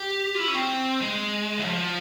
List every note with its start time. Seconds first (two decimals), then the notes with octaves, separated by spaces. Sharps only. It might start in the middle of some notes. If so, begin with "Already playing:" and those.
Already playing: G4
0.35 F4
0.39 E4
0.48 C#4
0.55 C4
1.01 G#3
1.58 E3
1.64 F3